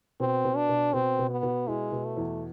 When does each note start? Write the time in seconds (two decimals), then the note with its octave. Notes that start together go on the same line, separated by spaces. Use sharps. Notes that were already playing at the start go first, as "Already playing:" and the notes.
0.20 B2 C4
0.45 B2
0.56 D4
0.69 B2
0.93 B2 C4
1.19 B2
1.30 B3
1.43 B2
1.67 G#3 E4
1.92 B2
2.05 A3
2.17 E2